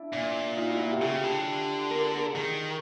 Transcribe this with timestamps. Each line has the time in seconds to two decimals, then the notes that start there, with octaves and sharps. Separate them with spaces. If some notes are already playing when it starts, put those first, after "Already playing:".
Already playing: D4 E4
0.13 A#2
0.56 D#4 F4
0.68 E4 F#4
0.78 E4 F#4
0.91 F4 G4
1.01 C#3 G4 A4
1.24 D3
1.90 A#4
2.03 A4
2.15 G#4 A#4
2.35 D#3